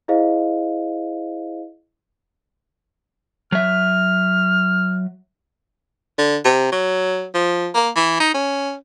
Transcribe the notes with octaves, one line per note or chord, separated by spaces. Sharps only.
E4 G#4 C5 D#5 F5
F#3 E5 F6
D3
C3
F#3
F3
A#3
E3
D#4
C#4